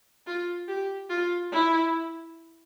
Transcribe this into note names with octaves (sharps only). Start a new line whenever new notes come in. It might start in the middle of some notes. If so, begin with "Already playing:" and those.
F4
G4
F4
E4